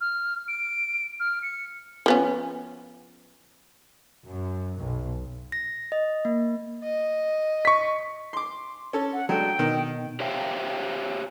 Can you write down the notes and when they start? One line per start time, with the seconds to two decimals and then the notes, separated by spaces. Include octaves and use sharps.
0.01 F6
0.48 D7
1.20 F6
1.42 C#7
2.06 F3 B3 C#4
4.27 F#2
4.78 B1
5.52 A#6
5.92 D#5
6.25 A#3
6.84 D#5
7.65 C#6 B6
8.33 C6 D6
8.93 C#4 A4
9.13 F#5
9.29 F#3 G#3 A3 D4 G5
9.59 B2 D#3
10.20 G4 C5 C#5 E5 F5 G5